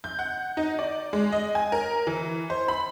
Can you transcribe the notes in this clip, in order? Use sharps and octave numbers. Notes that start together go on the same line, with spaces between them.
G6
F#5
D#4
D5
G#3
D#5
G#5
A#4
E3
C5
B5